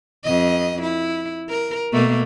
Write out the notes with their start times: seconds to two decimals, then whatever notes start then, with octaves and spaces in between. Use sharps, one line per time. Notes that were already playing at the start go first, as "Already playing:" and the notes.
0.25 F2 D#5
0.82 E4
1.49 A#4
1.93 B2 A3 A#3